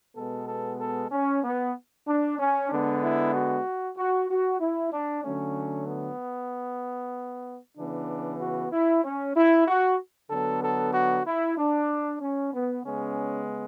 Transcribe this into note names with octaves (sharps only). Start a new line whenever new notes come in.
B2 G#3 B3 A4
A4
A4
C#4
B3
D4
C#4
D3 G#3 B3 D4
E4
F#4
F#4
F#4
E4
D4
D3 F#3 A3 C#4
B3
C#3 E3 B3 D4
F#4
E4
C#4
E4
F#4
D3 F#3 B3 A4
A4
F#4
E4
D4
C#4
B3
C#3 G#3 B3 C#4